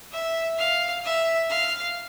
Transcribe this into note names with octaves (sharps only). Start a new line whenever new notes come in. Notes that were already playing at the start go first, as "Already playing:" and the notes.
E5
F5
E5
F5